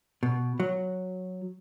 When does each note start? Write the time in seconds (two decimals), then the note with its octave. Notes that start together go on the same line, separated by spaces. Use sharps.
0.23 B2
0.60 F#3